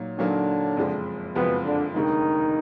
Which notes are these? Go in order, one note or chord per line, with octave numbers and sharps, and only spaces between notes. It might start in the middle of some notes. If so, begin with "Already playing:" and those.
Already playing: A#2 F#3 A#3 D#4
A#2 D3 F#3 A#3 D4 D#4
F#1 F2 F3 G#3
F#1 F2 B2 F3 G#3 B3
D3 D4
F1 D#2 D3 D#3 G#3 D#4